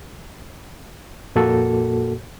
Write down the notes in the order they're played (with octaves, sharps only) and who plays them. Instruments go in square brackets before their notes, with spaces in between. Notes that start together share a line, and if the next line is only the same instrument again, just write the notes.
[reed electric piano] F2 A#2 A#3 F#4 A4